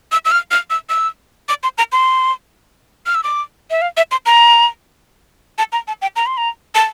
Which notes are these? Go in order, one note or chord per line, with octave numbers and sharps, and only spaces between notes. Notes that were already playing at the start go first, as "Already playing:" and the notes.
E6
E6
F6
F6
E6
E6
D6
C6
A#5
C6
F6
E6
D6
E5
F5
E5
C6
A#5
A5
A#5
A5
G5
A#5
C6
A#5
A5